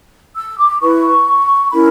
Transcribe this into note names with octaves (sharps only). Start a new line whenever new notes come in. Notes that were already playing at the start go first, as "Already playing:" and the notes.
E6
D6
E4 B4 C#6
C#4 E4 A#4 B5